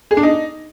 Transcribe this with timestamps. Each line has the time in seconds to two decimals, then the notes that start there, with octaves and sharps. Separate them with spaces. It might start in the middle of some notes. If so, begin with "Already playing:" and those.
0.11 G#4
0.17 D4
0.23 D#4